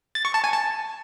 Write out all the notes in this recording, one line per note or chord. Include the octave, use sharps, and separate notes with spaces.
A6
C#6
A5
G#5
A5